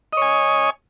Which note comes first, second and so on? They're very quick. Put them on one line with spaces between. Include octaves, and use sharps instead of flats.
D#5 C#5 G#5